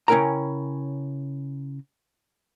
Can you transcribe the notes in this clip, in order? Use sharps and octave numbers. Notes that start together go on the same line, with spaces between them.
C#3 C#4 E4 A#4 G5 A#5